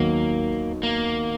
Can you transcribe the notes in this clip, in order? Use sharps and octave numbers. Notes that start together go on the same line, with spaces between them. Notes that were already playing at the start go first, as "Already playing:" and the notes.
Already playing: D#2 D#3 F#3 A#3 B3 D#4
A#3